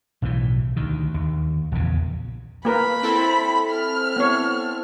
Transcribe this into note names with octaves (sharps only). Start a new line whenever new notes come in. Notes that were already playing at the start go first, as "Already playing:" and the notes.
B1 A2 D#3 E3
D2 D#3
D#2
A#1 E2 C#3
A#3 A#4 B4 B5
C4 E4 A4
F6
B3 C#5